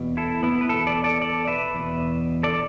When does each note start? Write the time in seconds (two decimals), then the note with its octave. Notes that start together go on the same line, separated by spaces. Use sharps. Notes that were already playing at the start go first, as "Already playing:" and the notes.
Already playing: E2 B2
0.17 E4 A4
0.43 B3 E4
0.61 B4
0.69 E2 B2 E4 A4
0.87 A4 D5
1.04 A4 D5
1.22 A4 D5
1.47 B4 E5
1.75 E2 B2
2.43 A4 D5